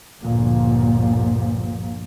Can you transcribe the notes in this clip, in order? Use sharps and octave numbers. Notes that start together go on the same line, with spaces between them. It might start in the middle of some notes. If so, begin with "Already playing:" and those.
G1 D2 A#2 F3